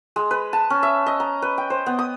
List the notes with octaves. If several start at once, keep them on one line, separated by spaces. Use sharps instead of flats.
G#3
B4
A5
C#4
E5
D#5
A#5
B4
G5
C5
B3
D#6